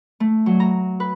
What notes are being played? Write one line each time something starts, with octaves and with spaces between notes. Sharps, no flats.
A3
F#3
A#5
B4